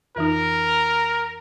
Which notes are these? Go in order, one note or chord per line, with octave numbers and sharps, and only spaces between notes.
F2 E3 D#4 A#4